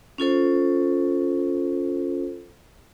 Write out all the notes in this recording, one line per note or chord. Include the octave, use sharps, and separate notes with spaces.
C#4 F4 A4 C5